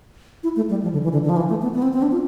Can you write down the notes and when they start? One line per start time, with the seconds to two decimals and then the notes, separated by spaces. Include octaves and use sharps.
0.43 E4
0.56 A3
0.70 G3
0.83 F3
0.93 D3
1.03 E3
1.13 D3
1.23 D3
1.29 F3
1.36 E3
1.49 A3
1.62 B3
1.74 B3
1.82 C4
1.93 C4
2.02 D4
2.12 F4